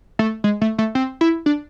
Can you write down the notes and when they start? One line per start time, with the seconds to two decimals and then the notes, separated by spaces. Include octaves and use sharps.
0.19 A3
0.44 G#3
0.62 A3
0.79 A3
0.95 C4
1.21 E4
1.46 D4